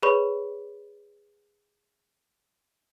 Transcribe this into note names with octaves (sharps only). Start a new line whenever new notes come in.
G#4 B4 C#5 D5 B5 C#6